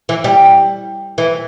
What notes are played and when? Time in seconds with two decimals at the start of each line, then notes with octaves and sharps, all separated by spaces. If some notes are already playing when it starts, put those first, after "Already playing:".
0.09 E3
0.24 G3
1.18 E3